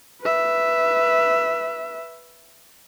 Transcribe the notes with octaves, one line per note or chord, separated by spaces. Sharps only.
B4 E5